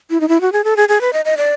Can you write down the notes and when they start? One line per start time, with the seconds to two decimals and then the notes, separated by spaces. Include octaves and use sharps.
0.10 E4
0.21 D#4
0.28 E4
0.41 F#4
0.53 G#4
0.64 A4
0.77 G#4
0.89 G#4
1.01 B4
1.13 D#5
1.25 D#5
1.37 D5